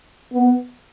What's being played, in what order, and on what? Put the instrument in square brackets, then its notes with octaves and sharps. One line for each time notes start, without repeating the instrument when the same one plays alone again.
[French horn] B3